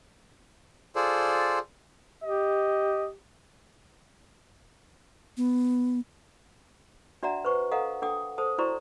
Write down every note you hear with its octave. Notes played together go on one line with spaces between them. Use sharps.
F4 G#4 A4 C5 D5
G4 D#5
B3
D4 F#4 D5 E5 F#5 A#5
B4 C5 C#6
A4 D#5 F5 F#5 A#5
D4 A4 F#5 G5 D6 D#6
A4 C5 A5 D#6
E4 F#4 C5 D5 A#5 C#6